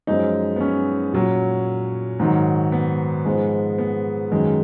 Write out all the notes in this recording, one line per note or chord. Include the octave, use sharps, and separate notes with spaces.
F#2 F3 G#3 D#4
B3
C#4
A#2 F#3
G#2 D#3 F#3
B3
G#2 F3 G#3
B3
F#2 D#3 G#3